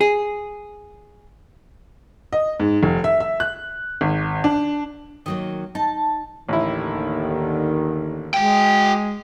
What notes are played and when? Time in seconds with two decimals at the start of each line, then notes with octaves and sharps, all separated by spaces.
0.01 G#4
2.33 D#5
2.60 G#2
2.83 F1
3.04 E5
3.20 E5
3.40 F#6
4.01 G#1
4.44 D4
5.26 D#3 F#3 A#3 D#5
5.75 D#4 A5
6.49 A1 D#2 D3 D#3 E4
8.34 G#3 F#4 G5